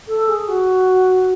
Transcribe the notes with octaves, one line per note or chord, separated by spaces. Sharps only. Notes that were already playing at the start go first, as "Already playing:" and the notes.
A4
G#4
F#4